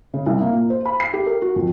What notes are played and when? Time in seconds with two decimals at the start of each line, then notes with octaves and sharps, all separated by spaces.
0.14 C#3
0.26 C2
0.41 A#3
0.53 A#2
0.70 C5
0.85 B5
1.00 C7
1.14 G4
1.27 A#4
1.42 F#4
1.56 F2